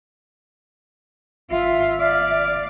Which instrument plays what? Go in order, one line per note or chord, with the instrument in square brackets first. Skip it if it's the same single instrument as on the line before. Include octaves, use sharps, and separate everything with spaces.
[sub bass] G#1 [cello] F4 [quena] E5
[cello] D5 [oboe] F5